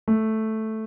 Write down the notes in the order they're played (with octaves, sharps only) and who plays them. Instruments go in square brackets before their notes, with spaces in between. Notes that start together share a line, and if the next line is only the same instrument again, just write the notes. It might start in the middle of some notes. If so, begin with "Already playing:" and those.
[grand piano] A3